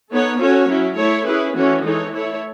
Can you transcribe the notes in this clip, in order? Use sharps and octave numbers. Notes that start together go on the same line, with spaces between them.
B3 D#4 A4 C#5
C#4 F#4 A4 C#5
F#3 C#4 E4
A3 E4 A4 C#5
C#4 E4 G#4 B4
E3 A3 C#4 F#4 C#5
E3 G#3 D#4 A4 C#5
A3 E4 A4 C#5